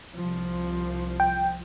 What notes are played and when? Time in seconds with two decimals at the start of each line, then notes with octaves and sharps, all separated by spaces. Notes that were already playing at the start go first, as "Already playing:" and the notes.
0.15 C2 F3
1.20 G5